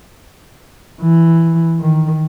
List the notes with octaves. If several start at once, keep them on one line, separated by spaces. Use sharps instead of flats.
E3
D#3